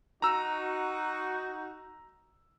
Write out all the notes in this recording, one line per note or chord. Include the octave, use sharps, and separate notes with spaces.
D#4 F#4 A#5 E6